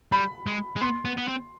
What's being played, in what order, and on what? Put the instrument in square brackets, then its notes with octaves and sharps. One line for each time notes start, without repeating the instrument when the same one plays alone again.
[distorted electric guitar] G3 [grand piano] B5
[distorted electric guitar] G#3
G#3
[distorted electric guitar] B3 [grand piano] C6
[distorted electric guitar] B3
B3
C4